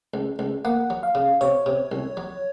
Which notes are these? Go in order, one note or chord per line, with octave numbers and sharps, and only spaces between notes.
C#2
C#2
A#3 F#5
F#3
F5
C#3
C3 C#5
C3
C2
F#3